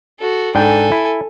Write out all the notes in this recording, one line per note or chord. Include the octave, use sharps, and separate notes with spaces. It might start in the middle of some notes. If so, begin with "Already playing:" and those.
F#4 A4
G#2 D4 A4 G5 G#5
E4